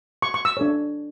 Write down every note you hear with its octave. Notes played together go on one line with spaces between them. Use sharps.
C#6
C#6
E6
D4 A4 C#5